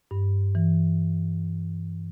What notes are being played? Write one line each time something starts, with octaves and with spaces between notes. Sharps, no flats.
G2
E3